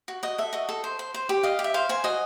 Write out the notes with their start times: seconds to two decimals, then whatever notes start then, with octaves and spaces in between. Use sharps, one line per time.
0.08 F#4
0.23 F#4 D#5
0.38 A4 E5
0.53 F#4 D#5
0.69 A4
0.84 C5
0.99 C5
1.14 C5
1.29 G4
1.43 D#5 F5
1.59 G4
1.64 E5
1.74 C5 F5
1.89 C5 G#5
2.04 F#4 D#5